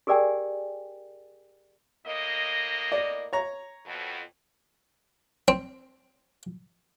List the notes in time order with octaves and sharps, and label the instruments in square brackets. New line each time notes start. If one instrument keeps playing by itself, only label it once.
[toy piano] G4 G#4 A#4 D5 G5 G#5
[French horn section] A2 A#3 D#5
[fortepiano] D5
C#5 A#5
[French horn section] F2 B2
[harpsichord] C4